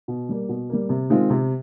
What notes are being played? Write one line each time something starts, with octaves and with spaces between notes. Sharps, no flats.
B2
G3 A#3
B2
G3 A#3
C3
D#3 G#3 C4 F4
C3